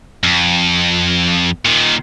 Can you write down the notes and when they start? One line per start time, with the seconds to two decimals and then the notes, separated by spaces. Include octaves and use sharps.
0.24 F2
1.65 A#2 D#3